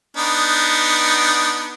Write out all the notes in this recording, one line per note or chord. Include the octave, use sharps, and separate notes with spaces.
B3 D4 D#4